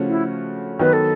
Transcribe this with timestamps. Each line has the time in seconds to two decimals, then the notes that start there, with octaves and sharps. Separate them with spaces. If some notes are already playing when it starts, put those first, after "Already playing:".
Already playing: C#3 F3 A3 C#4 F#4
0.09 E4
0.79 D#3 F#3 B3 B4
0.93 A4